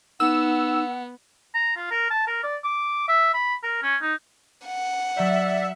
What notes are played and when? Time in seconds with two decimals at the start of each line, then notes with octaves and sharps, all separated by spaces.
0.20 B3 D#4 F#5 E6
1.55 A#5
1.76 F4
1.91 A#4
2.10 A5
2.27 A#4
2.44 D5
2.64 D6
3.08 E5
3.34 B5
3.63 A#4
3.83 C#4
4.02 D#4
4.67 F#5
5.16 F#3 D5 E5 A#5 G6